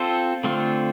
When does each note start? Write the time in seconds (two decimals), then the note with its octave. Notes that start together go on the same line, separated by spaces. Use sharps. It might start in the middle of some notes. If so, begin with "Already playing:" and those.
Already playing: C4 F4 A4 C5
0.44 D3 A3 C4 F4